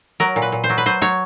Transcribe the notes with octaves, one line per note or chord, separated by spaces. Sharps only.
F#3 A#4
A#2
B4
A#2
C5
F#3
B4
F#3 C5
F#3 C#5